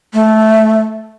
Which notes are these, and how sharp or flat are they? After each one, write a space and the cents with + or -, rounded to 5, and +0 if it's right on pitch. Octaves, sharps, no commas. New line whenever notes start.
A3 -10